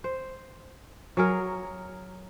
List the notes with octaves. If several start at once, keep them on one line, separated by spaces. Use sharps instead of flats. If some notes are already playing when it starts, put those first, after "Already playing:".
C5
F#3 G#4 A#4